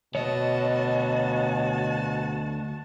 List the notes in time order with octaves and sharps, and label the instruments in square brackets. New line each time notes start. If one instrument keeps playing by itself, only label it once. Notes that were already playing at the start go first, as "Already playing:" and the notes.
[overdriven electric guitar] D2 D#5 [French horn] B2 [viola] F#4 A5 [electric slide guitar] C#5